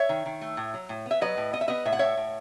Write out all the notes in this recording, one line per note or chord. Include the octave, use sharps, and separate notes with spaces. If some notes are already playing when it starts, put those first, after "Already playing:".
Already playing: C#5 E5
D#3
D#3
A3
A2
F#3
A2
B3 E5
F#3 B4 D#5
A2
B3 D#5
E5
B3 B4 D#5
A2 E5
F#5
A2 C#5 E5
A2